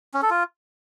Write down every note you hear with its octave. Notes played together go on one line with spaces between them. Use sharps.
C#4
A4
F4